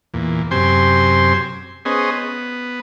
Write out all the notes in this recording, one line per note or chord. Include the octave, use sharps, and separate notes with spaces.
E2 A#2
F#2 C3 G4 C5 G#5 C6
B3 C#4 G#4 C5 D#5
B3